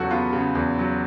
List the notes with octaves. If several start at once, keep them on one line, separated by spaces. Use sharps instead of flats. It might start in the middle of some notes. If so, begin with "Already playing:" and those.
Already playing: E2 C#3 F#3 F#4 A4
B3 F4
C#3
E2
F#3